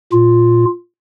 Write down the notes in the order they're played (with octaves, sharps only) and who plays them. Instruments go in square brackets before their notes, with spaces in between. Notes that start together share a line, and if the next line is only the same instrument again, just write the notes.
[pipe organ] A#2 F4